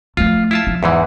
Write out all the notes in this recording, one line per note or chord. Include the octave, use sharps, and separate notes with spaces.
F3 A3 F4
E4 F4 A5
F3
E2 G#2 E3